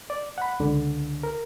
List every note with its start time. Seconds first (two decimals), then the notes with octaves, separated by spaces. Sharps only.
0.10 D5
0.38 F#5 B5
0.60 C#2 D3
1.23 A#4